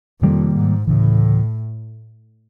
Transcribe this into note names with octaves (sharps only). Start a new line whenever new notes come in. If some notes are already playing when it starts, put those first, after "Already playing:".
F2 C3 D#3 G3 A#3
G#2
D2 A2 C#3 E3